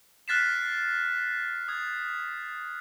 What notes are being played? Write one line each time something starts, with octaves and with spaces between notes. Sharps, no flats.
F6 F#6 A6 B6 C7 E7
D#6 G#6